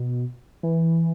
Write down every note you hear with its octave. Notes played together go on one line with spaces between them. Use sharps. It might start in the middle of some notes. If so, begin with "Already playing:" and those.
Already playing: B2
E3